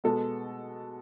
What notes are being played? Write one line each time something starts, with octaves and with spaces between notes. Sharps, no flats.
B2 G#3 B3 A4